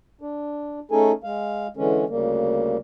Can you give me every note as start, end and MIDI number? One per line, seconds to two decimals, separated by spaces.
0.21 0.79 62
0.91 1.12 57
0.91 1.12 61
0.91 1.12 63
0.91 1.12 68
0.91 1.12 69
0.91 1.12 80
1.24 1.67 56
1.24 1.67 77
1.77 2.05 50
1.77 2.05 52
1.77 2.05 56
1.77 2.05 61
2.09 2.77 38
2.09 2.77 49
2.09 2.77 55
2.09 2.77 58